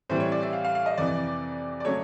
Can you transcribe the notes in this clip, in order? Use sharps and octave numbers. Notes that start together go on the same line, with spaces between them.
A2 E3 G3 C4 C5
C#5
D5
E5
F5
F5
F5
D#5
F2 C3 E3 D5
D5
C#3 F#3 A3 C#5